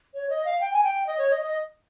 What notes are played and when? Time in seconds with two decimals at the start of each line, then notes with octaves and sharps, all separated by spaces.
0.14 C#5
0.30 D#5
0.45 F5
0.61 G5
0.73 G#5
0.84 G5
1.07 D#5
1.18 C#5
1.31 D#5
1.42 D#5